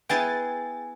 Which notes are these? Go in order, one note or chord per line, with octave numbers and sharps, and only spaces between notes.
B3 E4 G#4 G5 G#5 A6